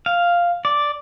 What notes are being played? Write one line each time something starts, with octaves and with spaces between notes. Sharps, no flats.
F5
D5